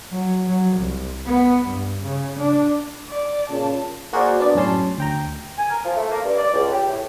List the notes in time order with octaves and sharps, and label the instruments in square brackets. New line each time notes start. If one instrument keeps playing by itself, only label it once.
[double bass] F#3
F#3
C2
B3
G2
C#3
D4
[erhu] D5
[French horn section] A#2 C#3 [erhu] A5
[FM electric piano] A#3 F#4 G#4 A#4 C5 D5
B3 D4 D5
F#2 A2 C#4 A5 C6
D2 G5 A#5
[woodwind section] G#5
A#4
F3
A3
A#3
G2
D5
C#2
G4
A2